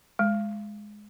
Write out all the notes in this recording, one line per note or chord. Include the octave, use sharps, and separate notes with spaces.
G#3